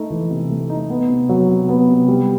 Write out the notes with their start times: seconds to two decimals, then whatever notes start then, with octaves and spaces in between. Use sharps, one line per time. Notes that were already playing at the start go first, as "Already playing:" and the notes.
Already playing: A3 D#4
0.10 E3
0.31 C3
0.50 A3
0.70 D#4
0.90 B3
1.10 C3
1.29 F#3
1.49 C3
1.69 B3
1.89 C3
2.08 G3